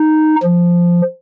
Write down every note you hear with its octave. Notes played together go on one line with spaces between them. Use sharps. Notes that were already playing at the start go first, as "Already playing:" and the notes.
Already playing: D#4
F3